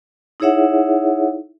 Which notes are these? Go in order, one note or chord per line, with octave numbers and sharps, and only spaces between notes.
D#4 E4 G#4 C#5 E5 F#5